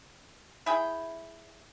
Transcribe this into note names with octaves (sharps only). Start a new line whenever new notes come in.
E4 G#4 G5